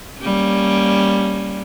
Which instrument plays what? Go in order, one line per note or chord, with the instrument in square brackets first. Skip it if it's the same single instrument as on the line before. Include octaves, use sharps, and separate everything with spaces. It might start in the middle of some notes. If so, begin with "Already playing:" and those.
[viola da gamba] G3 A#3 C#4